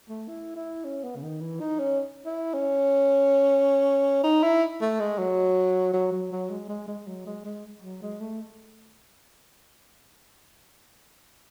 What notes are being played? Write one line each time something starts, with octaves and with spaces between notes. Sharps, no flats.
A3
E4
E4
C#4
B3
C#3
D#3
E3
D#4
C#4
E4
C#4
D#4
E4
A3
G#3
F#3
F#3
F#3
F#3
G#3
G#3
G#3
F#3
G#3
G#3
F#3
G#3
A3